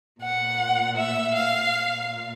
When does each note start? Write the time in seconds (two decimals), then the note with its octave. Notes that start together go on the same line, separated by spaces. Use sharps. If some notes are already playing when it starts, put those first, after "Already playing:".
0.22 A#2 F#5
0.97 E5
1.34 F5
1.71 A#2